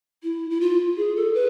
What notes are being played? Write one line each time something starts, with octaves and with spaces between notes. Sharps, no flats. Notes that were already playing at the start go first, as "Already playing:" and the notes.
E4
E4
F4
G#4
A4
B4